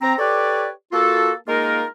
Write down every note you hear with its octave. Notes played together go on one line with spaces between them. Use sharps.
C4 A#5
G4 A4 B4 C#5 D5
A#3 F4 F#4 A4
G#3 A#3 D#4 F4 A#4